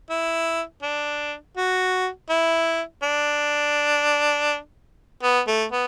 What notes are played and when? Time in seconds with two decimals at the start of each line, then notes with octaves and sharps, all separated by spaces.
0.10 E4
0.83 D4
1.57 F#4
2.30 E4
3.03 D4
5.23 B3
5.47 A3
5.72 B3